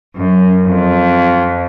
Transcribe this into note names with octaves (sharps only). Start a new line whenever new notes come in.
F#2
F2